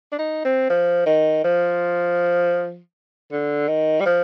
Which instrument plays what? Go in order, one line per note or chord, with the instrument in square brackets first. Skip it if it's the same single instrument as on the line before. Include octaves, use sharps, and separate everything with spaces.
[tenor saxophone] D4
D#4
C4
F3
D#3
F3
D3
D#3
G3
F3